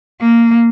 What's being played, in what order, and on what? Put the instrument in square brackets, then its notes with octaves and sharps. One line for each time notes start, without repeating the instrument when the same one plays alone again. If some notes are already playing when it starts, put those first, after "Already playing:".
[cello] A#3